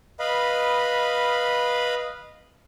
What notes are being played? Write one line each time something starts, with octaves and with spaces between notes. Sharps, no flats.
B4 D#5 F5 B5